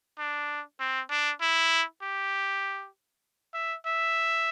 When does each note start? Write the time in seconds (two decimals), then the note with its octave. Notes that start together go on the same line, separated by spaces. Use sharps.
0.19 D4
0.80 C4
1.10 D4
1.41 E4
2.02 G4
3.54 E5
3.86 E5